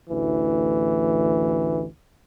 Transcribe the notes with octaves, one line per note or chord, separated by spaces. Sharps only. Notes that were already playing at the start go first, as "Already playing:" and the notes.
A1 D2 E3